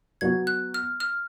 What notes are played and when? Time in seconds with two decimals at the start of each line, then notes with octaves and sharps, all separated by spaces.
0.21 F#3 B3 F#4 G#6
0.47 F#6
0.74 F6
1.00 F6